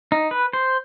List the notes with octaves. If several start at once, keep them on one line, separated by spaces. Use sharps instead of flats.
D#4
B4
C5